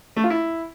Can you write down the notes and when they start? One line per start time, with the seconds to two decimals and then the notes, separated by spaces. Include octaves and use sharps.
0.17 A3
0.23 F4
0.30 E4